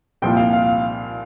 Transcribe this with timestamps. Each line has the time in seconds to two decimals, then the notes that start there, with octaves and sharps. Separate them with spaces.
0.22 C2 A#2 F3 G5
0.37 F5
0.53 F5